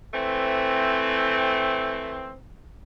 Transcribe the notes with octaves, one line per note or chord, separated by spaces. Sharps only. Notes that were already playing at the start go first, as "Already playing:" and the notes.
E3 A3 C4